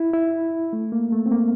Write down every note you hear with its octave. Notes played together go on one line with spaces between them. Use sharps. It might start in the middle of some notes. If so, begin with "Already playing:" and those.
Already playing: E4
E4
A3
A#3
A3
C4
A#3